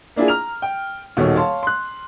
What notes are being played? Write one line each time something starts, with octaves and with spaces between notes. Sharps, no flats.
A#3 D4 E4 F4 G#4
A#5 F6 F7
G5
D#1 B2 D#3 C#5
C#5 F5 A5 C6
C6 F#6